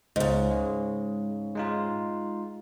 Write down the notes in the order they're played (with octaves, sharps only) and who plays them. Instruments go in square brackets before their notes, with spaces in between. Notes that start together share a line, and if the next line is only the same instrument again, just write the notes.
[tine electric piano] C#2 [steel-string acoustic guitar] G#2 C#3
[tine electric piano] G#3
G#3 D#4 F4